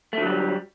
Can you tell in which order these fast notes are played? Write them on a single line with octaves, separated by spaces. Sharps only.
A3 D3 F#3 G3